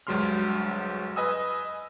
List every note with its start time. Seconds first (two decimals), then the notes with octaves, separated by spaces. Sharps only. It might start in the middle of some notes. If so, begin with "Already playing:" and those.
0.07 D2 G2 F#3 G#3 C6 F6
1.16 B4 D#5 G#5 D#6 E6